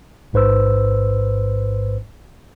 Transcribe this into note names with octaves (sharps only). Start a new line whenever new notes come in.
A1 G#2 B4 C5 E6